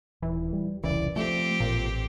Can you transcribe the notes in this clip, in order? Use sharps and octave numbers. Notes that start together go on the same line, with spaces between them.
D#1 E3
G3
E1 C2 C#3 E3 D5
F3 A3 C4 G4
A1 A#2